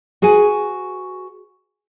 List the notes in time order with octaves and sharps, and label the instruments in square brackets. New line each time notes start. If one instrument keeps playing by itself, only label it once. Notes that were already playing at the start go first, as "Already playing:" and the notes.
[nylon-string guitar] F#4 G#4 B4 G#5